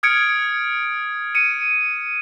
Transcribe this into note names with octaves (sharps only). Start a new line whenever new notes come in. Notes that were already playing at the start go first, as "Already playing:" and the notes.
D#6 F6 G#6 C#7 D7
C#7 D#7